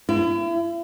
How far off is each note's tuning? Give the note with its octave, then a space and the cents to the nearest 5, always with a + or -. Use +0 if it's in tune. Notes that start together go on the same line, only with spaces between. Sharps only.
E4 +40